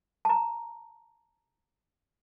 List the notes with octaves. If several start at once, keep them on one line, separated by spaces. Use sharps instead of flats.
A5 A#5